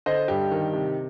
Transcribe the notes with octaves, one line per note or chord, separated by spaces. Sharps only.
D3 C5 D#5
G2 G4
D#3
C3